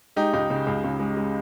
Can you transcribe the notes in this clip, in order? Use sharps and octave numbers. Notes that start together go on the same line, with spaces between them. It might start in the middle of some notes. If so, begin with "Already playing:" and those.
G#3 D#4 G4
C#2 D#4 G4
C#3
C#2
C#2
G#3
G#3